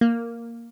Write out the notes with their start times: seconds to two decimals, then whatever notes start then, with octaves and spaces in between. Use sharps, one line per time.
0.01 A#3